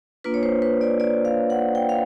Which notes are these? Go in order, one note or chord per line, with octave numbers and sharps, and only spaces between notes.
A#3 D4 F4 B4
C#5
C5
B4
D5
D5
F5
F#5
G5
F5